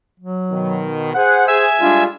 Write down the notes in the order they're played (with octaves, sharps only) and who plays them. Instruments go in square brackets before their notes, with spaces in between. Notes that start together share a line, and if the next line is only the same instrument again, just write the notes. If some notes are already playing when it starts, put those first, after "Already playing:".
[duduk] F#3
[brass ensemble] B2 D#3
[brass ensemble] G#4 F#5 [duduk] C5
[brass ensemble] G#4 [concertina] E5 G#5 E6
[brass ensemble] G3 G#3 D4 [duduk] F4